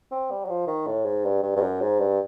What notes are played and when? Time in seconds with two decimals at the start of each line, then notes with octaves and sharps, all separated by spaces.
0.11 C4
0.31 G3
0.45 F#3
0.49 F3
0.67 D#3
0.87 A2
1.05 G#2
1.25 G2
1.43 G2
1.56 G2
1.61 F#2
1.81 G#2
2.00 G2